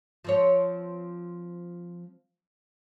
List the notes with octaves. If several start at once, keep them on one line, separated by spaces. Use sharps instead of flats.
F3 C4 C#5